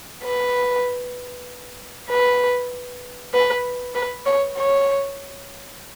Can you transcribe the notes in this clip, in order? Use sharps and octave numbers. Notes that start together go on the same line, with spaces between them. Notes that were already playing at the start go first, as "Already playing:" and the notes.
B4
B4
B4
B4
C#5
C#5